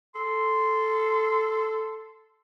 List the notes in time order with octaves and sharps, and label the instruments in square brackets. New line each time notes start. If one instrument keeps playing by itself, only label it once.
[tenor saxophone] A4 [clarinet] C6